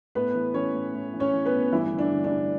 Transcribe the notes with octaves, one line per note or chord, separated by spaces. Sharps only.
A2 B3 B4
E3
E3 C#4 C#5
A2
A2
E3
C#4 C#5
E3
B3 B4
A2
G2 E3 E4
D3
D4
D3
D4
G2